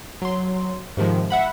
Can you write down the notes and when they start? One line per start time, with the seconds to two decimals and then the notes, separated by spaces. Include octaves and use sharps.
0.22 F#3 C6
0.97 G#2 C3 D#3 F3 G#3
1.30 E5 F#5 B5